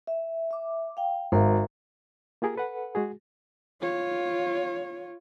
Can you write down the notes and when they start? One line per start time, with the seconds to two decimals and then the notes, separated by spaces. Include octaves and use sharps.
0.07 E5
0.51 E5 D6
0.97 F5 G5
1.32 G#1 A#4 E5 F5
2.42 A#3 F4 G4 G#4 A#4
2.56 A4 B4 F#5
2.95 G#3 F#4 G#4
3.81 F4 C#5